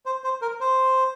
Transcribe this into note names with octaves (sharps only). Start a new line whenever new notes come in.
C5
C5
A#4
C5